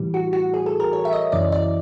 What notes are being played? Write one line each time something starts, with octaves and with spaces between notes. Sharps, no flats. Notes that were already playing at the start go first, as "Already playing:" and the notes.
Already playing: A2 E3 G3
F#4
F#4
G#4
A4
A#4
C#5
E5
D#5
F#2 C#3 E3 D5
D5